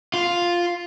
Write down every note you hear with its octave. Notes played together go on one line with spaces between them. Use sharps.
F4